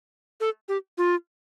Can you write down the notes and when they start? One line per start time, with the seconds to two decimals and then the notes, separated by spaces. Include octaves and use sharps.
0.40 A4
0.69 G4
0.98 F4